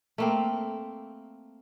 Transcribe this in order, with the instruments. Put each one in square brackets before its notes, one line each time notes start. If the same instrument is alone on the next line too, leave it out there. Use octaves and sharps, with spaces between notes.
[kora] A3 A#3 C4